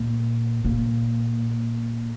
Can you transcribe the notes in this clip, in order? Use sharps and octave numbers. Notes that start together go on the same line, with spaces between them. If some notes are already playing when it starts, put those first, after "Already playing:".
Already playing: A#2
A#2